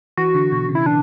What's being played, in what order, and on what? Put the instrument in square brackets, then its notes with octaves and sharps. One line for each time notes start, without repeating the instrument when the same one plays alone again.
[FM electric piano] E3 [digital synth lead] F#4
[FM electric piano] D3
B2
C#3
[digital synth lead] E4
[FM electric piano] E3 [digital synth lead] D4